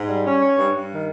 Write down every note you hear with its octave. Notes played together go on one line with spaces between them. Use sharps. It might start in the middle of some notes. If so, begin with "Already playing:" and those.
Already playing: G#2
G3
C#4
C#5
G2
G2
D#3